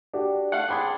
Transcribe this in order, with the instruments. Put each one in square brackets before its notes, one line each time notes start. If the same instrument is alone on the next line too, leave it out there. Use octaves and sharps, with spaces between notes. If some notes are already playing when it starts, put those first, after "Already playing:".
[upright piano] D4 F#4 G4
[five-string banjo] A3 F5 [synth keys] F#5
[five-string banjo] C4 D4 G#4 [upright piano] G5 B5 C6